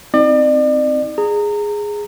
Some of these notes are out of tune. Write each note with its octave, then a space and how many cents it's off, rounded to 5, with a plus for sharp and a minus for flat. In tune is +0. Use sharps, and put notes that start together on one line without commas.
C4 +0 D#4 +30 D5 +40
G#4 -5 A#5 -25